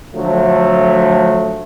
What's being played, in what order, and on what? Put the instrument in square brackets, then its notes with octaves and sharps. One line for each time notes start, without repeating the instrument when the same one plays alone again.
[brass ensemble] D3 F3 F#3 A3